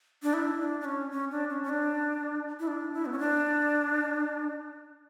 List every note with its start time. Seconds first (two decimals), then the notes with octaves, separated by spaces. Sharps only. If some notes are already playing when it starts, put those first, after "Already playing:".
0.23 D4
0.33 E4
0.59 D4
0.81 D4
0.85 C#4
1.11 C#4
1.31 D4
1.50 C#4
1.63 C#4
1.69 D4
2.59 E4
2.67 D4
2.93 E4
3.06 B3
3.12 C#4
3.19 D4